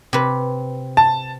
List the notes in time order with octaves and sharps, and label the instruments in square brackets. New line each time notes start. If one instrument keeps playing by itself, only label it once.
[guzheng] C3 B4
[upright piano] A5